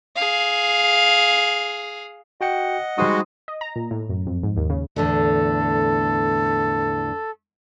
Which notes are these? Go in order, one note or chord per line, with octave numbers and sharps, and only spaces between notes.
G#4 F5
F#4 D#5 F#5 G5 C#7
G3 G#3 D#4 F#4 C5 D#6
D#5
A#5
A#2
A2
F#2
F2
G#2
D#2
C#3
E2 A2 D3 A4